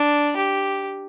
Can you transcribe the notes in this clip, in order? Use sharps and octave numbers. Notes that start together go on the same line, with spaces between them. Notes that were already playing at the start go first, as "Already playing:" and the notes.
Already playing: D4
G4